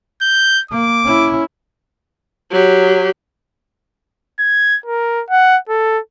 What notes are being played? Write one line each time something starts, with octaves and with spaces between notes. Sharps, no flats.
G6
A#3 D6
C#4 E4
F#3 G4
G#6
A#4
F#5
A4